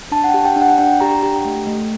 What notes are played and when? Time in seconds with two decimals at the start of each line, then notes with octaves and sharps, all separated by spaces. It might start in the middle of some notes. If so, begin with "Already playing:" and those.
0.12 D4 A5
0.24 F#5
0.29 G5
0.34 G4
0.45 G5
0.56 D4
0.62 F#5
0.78 D4 G5
1.00 G4 A#5
1.22 G4 G5
1.45 A3
1.66 A3